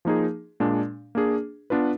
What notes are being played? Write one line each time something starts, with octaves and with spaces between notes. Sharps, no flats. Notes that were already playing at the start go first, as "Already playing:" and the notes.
F3 A#3 D#4 G#4
A#2 G#3 D4
A#3 D4 G#4
B3 D4 F4 B4